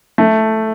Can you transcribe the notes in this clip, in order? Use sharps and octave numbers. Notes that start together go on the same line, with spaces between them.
A3